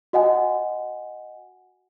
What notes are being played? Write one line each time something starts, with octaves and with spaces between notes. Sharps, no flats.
F#4 D#5 F#5 G#5